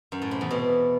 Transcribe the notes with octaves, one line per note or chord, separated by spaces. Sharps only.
F#2
A2
C3
E2
B2